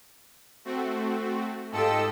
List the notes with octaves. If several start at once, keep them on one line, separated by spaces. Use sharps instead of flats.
A3 C4 F#4
G#2 F4 G4 A4 D#5 E6